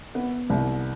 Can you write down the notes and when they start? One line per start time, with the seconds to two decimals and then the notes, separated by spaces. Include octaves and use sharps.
0.15 B3
0.50 C2